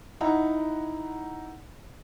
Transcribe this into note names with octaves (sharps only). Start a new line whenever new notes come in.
D#4 E4 F#5 A#5